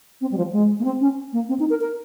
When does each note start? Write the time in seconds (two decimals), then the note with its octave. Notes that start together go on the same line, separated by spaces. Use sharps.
0.21 C4
0.32 G3
0.37 F3
0.52 G#3
0.79 A#3
0.85 C4
1.01 C#4
1.33 A#3
1.49 C4
1.60 D#4
1.70 A#4
1.81 A#4